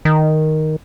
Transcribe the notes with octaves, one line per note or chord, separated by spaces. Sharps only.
D#3